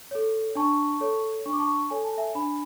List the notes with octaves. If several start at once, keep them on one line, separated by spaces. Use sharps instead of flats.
A4 C#5
D4 A5 C#6
A4 C#5
D4 C#6
D6
A5 C#6
A4 C#5 G#5
A5
E5 G#5
D4 G#5 B5